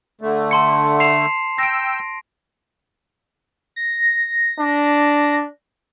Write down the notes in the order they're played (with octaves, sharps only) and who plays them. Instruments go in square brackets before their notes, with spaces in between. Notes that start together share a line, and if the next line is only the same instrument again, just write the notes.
[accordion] D3 A3
[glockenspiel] A5 C6 C#7
C7 E7 F7
[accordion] G5 E6 [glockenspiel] A#6 D7
[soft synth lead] A#6
[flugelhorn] D4